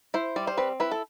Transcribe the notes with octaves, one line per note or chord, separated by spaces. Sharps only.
E4 C5
G3 D5
C5
C4 B4
E4 B4
A4